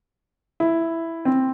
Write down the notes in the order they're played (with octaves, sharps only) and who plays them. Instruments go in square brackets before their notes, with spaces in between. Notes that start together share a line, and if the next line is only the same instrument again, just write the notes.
[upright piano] E4
C4